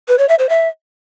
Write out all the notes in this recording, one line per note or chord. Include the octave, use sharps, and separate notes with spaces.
B4
C#5
E5
C5
E5